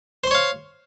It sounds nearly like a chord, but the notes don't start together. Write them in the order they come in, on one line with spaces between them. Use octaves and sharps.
C5 C6 C#5 F5